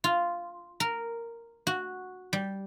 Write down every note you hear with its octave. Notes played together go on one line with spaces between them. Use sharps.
F4
A#4
F#4
G3